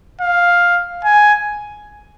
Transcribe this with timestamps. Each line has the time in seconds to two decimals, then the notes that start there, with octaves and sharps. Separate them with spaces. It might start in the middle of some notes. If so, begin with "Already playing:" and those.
0.21 F5
1.04 G#5